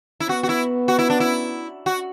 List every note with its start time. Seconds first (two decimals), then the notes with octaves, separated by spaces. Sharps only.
0.20 E4
0.29 B3 F#4
0.43 F#4
0.49 E4
0.88 F#4
0.99 E4
1.10 D4
1.20 E4
1.86 F#4